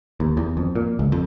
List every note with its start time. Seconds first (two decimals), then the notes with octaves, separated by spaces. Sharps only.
0.20 D#2
0.37 E2
0.57 F2
0.75 A#2
0.99 C#2
1.12 F2